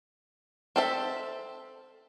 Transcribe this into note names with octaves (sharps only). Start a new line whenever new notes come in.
C4 A4 E5